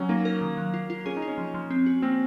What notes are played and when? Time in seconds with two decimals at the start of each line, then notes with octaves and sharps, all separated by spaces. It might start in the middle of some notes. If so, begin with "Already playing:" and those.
Already playing: F#3 C#4
0.09 A#3 D#4
0.25 A#4
0.41 D#3
0.57 F#3
0.74 F4
0.90 F4
1.06 C#4 G#4
1.17 D#4
1.22 F4
1.28 C#4
1.38 F3
1.54 F3
1.71 C4
1.86 F#4
2.02 A#3 C4